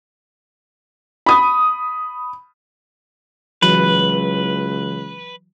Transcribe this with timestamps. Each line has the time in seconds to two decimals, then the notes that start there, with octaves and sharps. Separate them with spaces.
1.26 B5 D#6
3.62 C#2 E3 F#3 B4